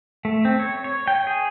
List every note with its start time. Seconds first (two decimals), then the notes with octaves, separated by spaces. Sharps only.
0.25 A3
0.45 C4
0.60 C#5
0.84 C#5
1.08 G5
1.27 G#4